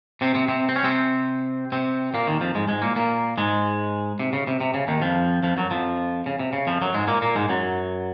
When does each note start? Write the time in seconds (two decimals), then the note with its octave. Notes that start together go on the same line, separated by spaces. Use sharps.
0.21 C3 C4
0.35 C3 C4
0.48 C3 C4
0.69 C4
0.76 C#4
0.84 C3 C4
1.72 C3 C4
2.14 A#2 A#3
2.27 D#2 D#3
2.41 F2 F3
2.55 G#2 G#3
2.68 G#2 G#3
2.82 A#2 A#3
2.96 A#2 A#3
3.38 G#2 G#3
4.19 C3
4.33 C#3
4.47 C3
4.60 C3
4.74 C#3
4.88 D#2 D#3
5.02 F2 F3
5.43 F2 F3
5.57 F#2 F#3
5.71 F2 F3
6.26 C#3
6.39 C3
6.53 C#3
6.67 F2 F3
6.81 F#2 F#3
6.94 G#2 G#3
7.08 A#2 A#3
7.22 A#2 A#3
7.35 G#2 G#3
7.49 F#2 F#3